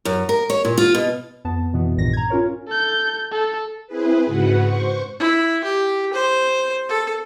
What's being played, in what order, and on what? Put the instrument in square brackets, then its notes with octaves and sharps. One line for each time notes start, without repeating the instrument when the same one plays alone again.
[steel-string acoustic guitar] F#2
A#4
C#5
A#2
F4
B2
[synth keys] F2 B3 A5
F2 B2 E3 B3
A#1 G2 A#2 D#3 A#6
A#5 G#6
C#4 F4 A#4 C#5
[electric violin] A4 G6
A4
[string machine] C4 E4 G#4 B4
G#2 C#3 F#4 B4 F#5
C5 C#6
[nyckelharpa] E4
G4
C5
A4